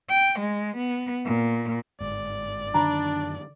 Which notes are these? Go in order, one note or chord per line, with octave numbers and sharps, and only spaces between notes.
G5
G#3
B3
A#2
G1 G#2 D5
F#2 D3 D#3 D4 A#5 B5